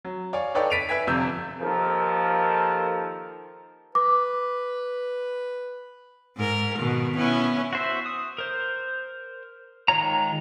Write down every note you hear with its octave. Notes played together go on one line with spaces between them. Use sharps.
F#3
C#5 D5 F5 G#5
D#4 A4 B4 C#5 D5 G5
A6 B6 D7 D#7 F7
B4 E5 G#5 G#6 B6
G1 F2 C3 E6 G6
D#2 F3 A4 A#4
B4 D6
G#2 A#4
B2 D#3
B3 C#4 E4
F#4 C5 E5
D#6
A#4 C5
D#3 G#3 F4 C#5 A#5